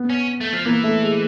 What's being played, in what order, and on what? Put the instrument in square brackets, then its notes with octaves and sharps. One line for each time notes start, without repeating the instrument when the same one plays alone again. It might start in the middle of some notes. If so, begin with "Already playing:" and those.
Already playing: [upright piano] B3
[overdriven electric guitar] C#4
A3
F3
[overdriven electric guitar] E3 [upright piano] A#3
[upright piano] A3
G#3